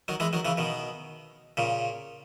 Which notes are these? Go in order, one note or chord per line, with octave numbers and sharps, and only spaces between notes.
D#3 F#3
E3 G#3
D#3 F#3
C#3 E3
B2 D#3
A#2 C#3